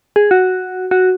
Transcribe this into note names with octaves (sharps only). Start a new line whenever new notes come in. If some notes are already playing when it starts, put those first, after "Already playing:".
G#4
F#4
F#4